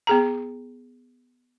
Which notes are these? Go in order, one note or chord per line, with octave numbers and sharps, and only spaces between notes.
B3 G#4 A#5